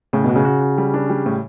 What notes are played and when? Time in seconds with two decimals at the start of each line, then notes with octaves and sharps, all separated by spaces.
0.13 A2 C#3
0.24 B2 F#4
0.35 C#3
0.45 F#4
0.61 F#4
0.78 G3
0.94 D4
1.10 G3
1.26 A2